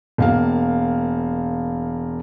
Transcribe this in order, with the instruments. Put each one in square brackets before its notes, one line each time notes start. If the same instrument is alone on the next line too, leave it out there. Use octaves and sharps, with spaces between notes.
[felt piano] E1 A#3 F5